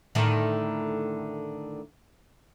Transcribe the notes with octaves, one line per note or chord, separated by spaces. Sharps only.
A2 D3 D#3